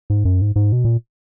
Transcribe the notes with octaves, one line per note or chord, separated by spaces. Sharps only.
G#2
F#2
G#2
G#2
B2
A#2